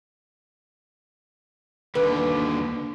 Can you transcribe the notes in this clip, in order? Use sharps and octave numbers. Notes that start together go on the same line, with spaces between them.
D#2 D3 B4